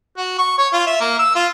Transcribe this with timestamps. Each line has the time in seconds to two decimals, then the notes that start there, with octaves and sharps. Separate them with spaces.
0.17 F#4
0.38 C#6
0.58 C#5
0.73 F4
0.86 E5
1.01 A#3
1.19 E6
1.35 F4